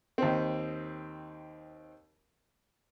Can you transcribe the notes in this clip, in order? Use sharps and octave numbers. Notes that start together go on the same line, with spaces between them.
D#2 C4